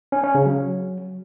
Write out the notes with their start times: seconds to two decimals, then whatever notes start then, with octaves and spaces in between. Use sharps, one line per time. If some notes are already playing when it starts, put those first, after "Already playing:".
0.12 C#4
0.23 C#4
0.35 C#3
0.46 F#3